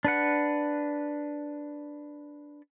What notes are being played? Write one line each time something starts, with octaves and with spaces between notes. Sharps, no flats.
D4 B4 F#5